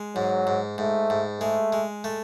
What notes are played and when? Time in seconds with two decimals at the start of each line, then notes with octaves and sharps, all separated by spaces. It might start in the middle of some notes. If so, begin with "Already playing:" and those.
Already playing: G#3
0.15 G#2 F#3
0.47 G#2
0.78 G#2 A3
1.10 G#2
1.41 G#3 A3
1.73 G#3
2.04 A3